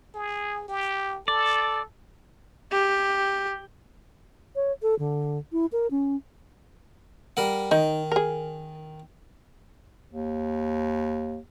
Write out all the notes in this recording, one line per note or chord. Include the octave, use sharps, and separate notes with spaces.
G#4
G4
A4 D5
G4
C#5
A4
D3
E4
A#4
C#4
G3 A#4 F#5
D#3 D#4
G#4 A#4
D#2